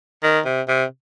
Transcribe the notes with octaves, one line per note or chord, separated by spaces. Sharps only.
D#3
C3
C3